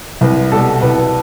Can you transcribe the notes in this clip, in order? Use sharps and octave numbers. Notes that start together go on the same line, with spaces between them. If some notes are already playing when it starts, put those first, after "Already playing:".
C2 B4
B2 G3 A4
C2 B4